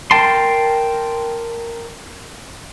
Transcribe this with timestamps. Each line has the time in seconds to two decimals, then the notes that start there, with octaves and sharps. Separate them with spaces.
0.11 A#4 G5 A5 C6